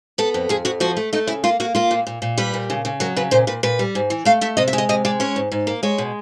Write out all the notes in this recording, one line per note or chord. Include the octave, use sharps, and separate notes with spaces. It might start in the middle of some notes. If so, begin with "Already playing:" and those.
B3 A4
F2
F2 G#4
F2 F#4
F3 F#4
A3
A3 D#4
C#3 E4
A#3 F4
A#3 F#4
A#3 F4
A#2
A#2
A#2
G3 B4
A#2
C#3
C#3
F#3 A#4
C#3 B4
A#2 C5
A#2 B4
A#2 B4
G3
G#2
E3
A3 F5
A3 E5
C3 D#5
E5
G#3
D#5
C3 D#5
G#3 D5
C#4 C#5
G#2
G#2
A#3
G#3 C#5
B2